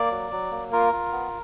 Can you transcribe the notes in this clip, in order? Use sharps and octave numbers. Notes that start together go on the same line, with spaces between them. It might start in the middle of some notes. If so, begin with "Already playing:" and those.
Already playing: A#3 D5
F#3
F#3
A#3
F4 A#4
F4
B3